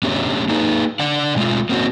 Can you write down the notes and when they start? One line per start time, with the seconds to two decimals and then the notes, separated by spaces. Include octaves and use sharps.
0.03 A3 B3 C#4 D4 G4
0.48 A#3 D#4 G#4 A4 B4
1.00 D4 D5 F#5
1.36 B2 G#3 A3 F4
1.69 A#3 C4 C#4 F#4